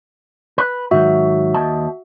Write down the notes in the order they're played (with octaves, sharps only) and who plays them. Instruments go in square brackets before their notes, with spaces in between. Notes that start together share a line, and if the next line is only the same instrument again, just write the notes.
[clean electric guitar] B4
[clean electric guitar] G#2 D#3 F#3 [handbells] F#4 E5
[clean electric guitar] D#2 D#5 A5